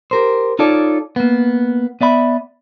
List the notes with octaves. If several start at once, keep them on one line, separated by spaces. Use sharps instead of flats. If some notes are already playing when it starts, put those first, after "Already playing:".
G4 A#4 C5
D#4 F4 A4 C#5 D5
A#3 B3
B3 D5 E5 B5